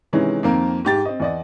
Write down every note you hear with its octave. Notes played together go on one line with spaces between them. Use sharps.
C3 D#3 E3 G#3 C#4
F2 D#3 A#3 C4 A#4
G#2 G4 A6
C4 D#5
E2 D5 D#5